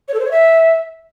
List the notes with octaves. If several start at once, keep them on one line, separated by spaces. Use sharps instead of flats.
C#5
A4
C5
C#5
E5